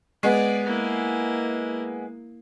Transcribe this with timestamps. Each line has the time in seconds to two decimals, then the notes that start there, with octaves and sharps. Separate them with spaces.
0.23 G#3 B3 G#4 D5
0.65 A#3 E4